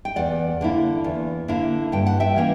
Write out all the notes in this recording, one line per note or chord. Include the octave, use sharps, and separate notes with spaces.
G5
E2 D5 F#5
D3 A#3 E4
E2
D3 A#3 E4
G2 G5
F#5
E5 G5
E3 A#3 C#4